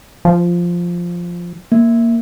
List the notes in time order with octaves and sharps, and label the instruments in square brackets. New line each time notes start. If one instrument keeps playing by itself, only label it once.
[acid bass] F3
[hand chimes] A#3